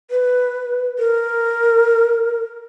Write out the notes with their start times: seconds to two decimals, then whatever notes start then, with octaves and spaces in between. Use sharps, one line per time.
0.11 B4
0.99 A#4